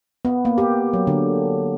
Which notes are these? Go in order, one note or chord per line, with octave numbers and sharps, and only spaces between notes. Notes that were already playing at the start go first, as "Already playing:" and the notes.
B3
A#3
G4
F#3
D3